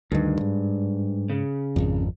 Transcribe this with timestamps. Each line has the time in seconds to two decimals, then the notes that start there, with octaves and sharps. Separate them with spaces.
0.12 D2 G2 D#3
0.41 G#2
1.30 C#3
1.76 G#1 F2